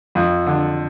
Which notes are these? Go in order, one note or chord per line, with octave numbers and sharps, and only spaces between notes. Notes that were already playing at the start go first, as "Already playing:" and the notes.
F2
D3